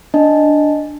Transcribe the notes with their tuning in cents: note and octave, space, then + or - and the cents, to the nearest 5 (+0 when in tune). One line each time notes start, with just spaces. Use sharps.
D4 +0 D#5 +0 A5 +0